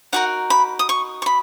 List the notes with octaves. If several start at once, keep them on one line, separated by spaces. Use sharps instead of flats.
D#4 F#4 A#4 F#5
B5
D#6
C#6
C#6
B5